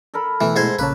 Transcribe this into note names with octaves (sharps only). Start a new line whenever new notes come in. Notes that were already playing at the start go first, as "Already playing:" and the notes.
A4 A#4 B5
B2 E3 A3 E4
G#2 C5 G#5
A#1 C#3 A#3 B4 C#5 A5